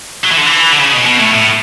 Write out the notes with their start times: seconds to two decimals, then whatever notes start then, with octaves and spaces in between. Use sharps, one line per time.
0.24 F#3
0.31 E3
0.38 D3
0.46 E3
0.72 D3
0.79 C#3
0.92 B2
1.06 B2
1.20 A2
1.34 A2